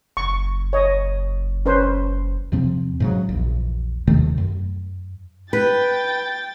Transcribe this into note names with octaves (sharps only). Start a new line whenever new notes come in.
F#1 C#6
C#5 D#5
C#4 B4 C5
E2 C3 F3 C4
G#2 C#3 F#3
A#1 E2
D#2 C3 D#3 A3
F#2
B4 G5 A6